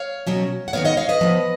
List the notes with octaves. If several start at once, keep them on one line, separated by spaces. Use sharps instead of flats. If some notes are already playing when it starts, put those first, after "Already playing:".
Already playing: C#5 F5
B2 F#3 C#4
F#5
D#3 F#3 B3 C#5 F5
D#5 F#5
C#5 F5
B4 D#5
F3 B3